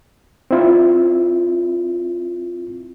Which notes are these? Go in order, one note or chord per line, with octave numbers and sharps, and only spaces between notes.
C4 E4 F4